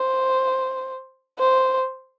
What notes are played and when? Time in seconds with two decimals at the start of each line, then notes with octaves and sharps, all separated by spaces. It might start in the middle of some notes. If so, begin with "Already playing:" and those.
Already playing: C5
1.39 C5